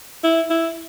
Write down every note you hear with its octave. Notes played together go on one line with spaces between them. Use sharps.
E4
E4